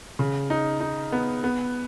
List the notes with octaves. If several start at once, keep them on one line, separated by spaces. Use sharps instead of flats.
C#3
D#4
D#4
B3
B3